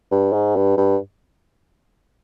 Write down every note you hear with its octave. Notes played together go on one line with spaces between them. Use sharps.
G2
G#2
G2
G2